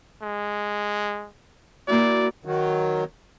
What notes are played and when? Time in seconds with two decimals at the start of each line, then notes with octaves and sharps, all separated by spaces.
0.22 G#3
1.88 A#3 E4 F#4 D5
2.45 D#3 F#3